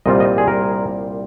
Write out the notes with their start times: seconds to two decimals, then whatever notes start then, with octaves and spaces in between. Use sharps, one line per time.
0.06 C2 A#2 G3 C4 F4 D#5
0.20 D#5
0.38 G#4
0.48 A#4